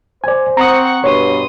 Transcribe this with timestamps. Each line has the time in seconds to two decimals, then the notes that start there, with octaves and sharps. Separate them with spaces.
0.24 C5 D5 G#5
0.57 C4 F#5 A#5 C#6 D#6
1.04 G2 B2 C#5 C6 D#6